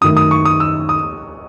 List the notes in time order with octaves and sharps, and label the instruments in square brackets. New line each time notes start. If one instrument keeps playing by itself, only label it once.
[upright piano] F#2 D#3 A3 [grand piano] D#6
[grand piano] D#6
C#6
D#6
E6
D#6